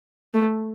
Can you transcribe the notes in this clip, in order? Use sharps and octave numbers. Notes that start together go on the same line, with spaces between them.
A3